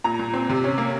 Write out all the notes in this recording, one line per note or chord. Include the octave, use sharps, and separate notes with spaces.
A#2 A#5
A#2
C4
C3
C#4
A#3